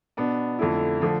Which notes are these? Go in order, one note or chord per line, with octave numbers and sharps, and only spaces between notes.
B2 B3 D4
F2 D3 A3 E4
D3 F3 A3